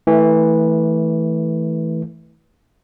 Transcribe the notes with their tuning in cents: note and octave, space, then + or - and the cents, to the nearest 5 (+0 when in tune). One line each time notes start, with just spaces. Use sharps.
E3 -15 A3 +0